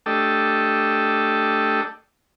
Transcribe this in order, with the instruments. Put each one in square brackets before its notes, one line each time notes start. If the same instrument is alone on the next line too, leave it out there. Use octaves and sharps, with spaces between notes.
[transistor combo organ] A3 D4 G4 A4 D#5